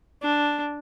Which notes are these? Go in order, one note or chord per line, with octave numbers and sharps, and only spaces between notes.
D4